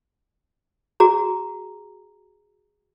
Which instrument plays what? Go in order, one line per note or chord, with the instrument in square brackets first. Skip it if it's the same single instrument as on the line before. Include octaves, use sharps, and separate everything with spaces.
[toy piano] F#4 G#4 A#5